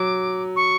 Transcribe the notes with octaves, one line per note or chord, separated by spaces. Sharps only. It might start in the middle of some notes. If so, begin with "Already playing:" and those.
Already playing: F#3 D6
C#6